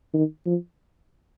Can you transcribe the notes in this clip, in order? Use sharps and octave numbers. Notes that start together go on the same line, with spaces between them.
D#3
F3